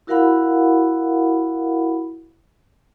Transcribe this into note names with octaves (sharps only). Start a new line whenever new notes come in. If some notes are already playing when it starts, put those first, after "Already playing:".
E4 F#4 A#4 F5 F#5 B5